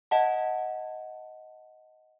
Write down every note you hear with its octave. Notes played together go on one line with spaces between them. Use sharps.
D#5 F#5 A5